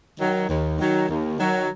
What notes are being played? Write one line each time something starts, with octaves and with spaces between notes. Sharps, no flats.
D#3 F#3
D#2
D#3 F#3
D#2
D#3 F#3